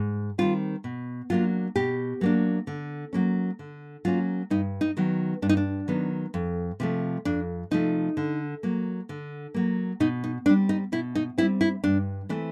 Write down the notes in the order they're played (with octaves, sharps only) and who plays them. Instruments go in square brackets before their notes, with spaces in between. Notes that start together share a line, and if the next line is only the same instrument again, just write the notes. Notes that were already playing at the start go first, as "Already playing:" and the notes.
Already playing: [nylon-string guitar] G#2
D#3 G3 C4 F4
B2
F#3 A#3 D4 F4
B2 G4
F#3 A#3 D4
D3
F#3 A#3 C#4
D3
F#3 A#3 C#4 F4
G2 D#4
D#4
D#3 F#3 B3
G2 D4
D#4
D4
D#3 F#3 B3
F2
C3 F3 A3
F2 D4
C3 F3 A3 D#4
D3
F#3 A#3
D3
F#3 A#3
B2 D#4
D#4
G3 C4 D4
D#4
B2 E4
D#4
G3 C4 E4
E4
G2 D4
E3 A3 C4 D4